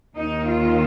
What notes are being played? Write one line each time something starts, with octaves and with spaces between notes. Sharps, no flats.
D#2 D#3 D#4
F4